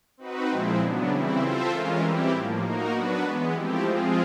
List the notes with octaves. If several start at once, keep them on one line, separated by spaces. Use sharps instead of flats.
C4 D#4 F#4 B4
A#2 F3 G#3 C4 E4
C#3 F#3 B3 D4
C#3 E3 G3 C4 E4
C4 F4 A4 C5 E5
E3 G#3 C#4 F4 A#4
E3 G3 C4 E4 G4
A2 F3 A#3
A#3 D#4 F#4 A#4
F#3 B3 D4 F#4 B4
E3 G#3 B3
F3 A3 C4 E4 G4
F3 G#3 C4 F4 G#4